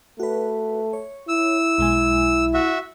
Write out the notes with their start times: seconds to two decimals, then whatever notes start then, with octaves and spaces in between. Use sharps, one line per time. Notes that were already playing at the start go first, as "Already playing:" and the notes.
0.20 A3 F#4 B4
0.93 C#5
1.28 E4 E6
1.78 B1 G#3 G#5
2.54 F#4 E5